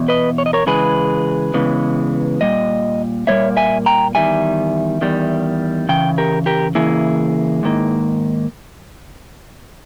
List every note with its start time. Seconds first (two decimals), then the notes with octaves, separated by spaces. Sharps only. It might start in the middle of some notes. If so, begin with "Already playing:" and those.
Already playing: E2 B2
0.08 B4 D#5
0.38 C#5
0.46 D#5
0.53 A#4 C#5
0.67 C#3 E3 G#3 G#4 B4
1.54 C#3 E3 G#3 B3
2.41 A#2 G3 D#5
3.27 A#2 G3 A#3 C#5 E5
3.57 E5 G#5
3.86 G5 A#5
4.15 E2 D#3 G3 E5 G#5
5.01 E2 D#3 G3
5.89 C#3 E3 G5
6.18 G4 A#4
6.46 G4 A#4
6.75 C#3 E3 A#3 E4 G#4
7.63 G#2 D#3 A#3